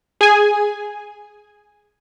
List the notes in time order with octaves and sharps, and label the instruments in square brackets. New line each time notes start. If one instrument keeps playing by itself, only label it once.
[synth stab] G#4 G#5